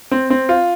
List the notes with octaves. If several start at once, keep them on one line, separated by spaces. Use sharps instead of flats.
C4
C4
F4